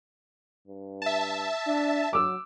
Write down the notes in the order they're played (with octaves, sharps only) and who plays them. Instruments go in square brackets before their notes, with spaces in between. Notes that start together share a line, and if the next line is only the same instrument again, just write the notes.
[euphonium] G2
[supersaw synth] E5 A5
[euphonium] D4
[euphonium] F#3 [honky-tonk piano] D6 E6